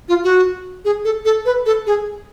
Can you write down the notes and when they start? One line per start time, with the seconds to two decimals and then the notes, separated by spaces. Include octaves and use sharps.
0.09 F4
0.24 F#4
0.85 G#4
1.05 A4
1.25 A4
1.45 B4
1.66 A4
1.87 G#4